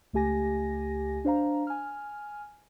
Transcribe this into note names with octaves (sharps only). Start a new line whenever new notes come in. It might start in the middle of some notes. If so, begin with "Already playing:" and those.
C#2 A3 G4 G#5 A#6
D4 C5 F5 A#5
G#5 F6